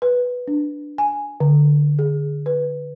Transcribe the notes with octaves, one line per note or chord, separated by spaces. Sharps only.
B4
D4
G#5
D3
G#4
B4